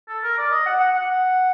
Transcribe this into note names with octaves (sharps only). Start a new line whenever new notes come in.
A4
A#4
D5
D#5
F#5
F#5
F#5